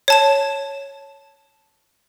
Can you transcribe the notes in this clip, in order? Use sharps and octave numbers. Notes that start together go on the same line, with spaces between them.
C#5 A5 E7